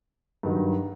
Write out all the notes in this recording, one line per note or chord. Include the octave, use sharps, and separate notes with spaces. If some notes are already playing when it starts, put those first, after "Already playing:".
G2 D#3 F#3